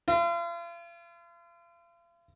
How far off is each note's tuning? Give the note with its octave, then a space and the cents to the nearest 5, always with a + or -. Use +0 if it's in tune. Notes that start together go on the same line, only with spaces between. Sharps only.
F4 -40